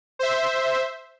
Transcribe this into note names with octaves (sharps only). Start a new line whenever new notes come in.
C5 E5